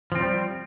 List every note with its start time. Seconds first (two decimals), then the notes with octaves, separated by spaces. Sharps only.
0.12 F3
0.15 C4
0.19 G3